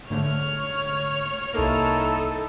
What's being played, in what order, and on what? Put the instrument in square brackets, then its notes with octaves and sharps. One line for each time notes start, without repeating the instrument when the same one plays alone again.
[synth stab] G#2 D3 A3 [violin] C#5 F6
[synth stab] C2 A#3 [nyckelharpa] D#4 E4 [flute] A4